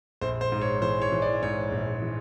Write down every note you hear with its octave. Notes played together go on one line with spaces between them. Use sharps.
A#1 C5
C5
G#2
C#5
E3 C5
C#5
E3
D5
G#2 C#5
A#1
E3